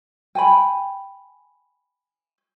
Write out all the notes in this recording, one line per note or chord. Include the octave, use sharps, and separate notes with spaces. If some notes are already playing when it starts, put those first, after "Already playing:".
G5 G#5 B5